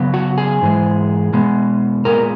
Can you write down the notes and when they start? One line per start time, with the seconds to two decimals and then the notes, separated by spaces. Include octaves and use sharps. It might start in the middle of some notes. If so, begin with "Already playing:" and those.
Already playing: C#3 F#3 B3
0.14 F#4
0.38 G#4
0.62 G#2 E3 G#3
1.33 B2 G#3 B3
2.05 A#2 G#3 B3 A#4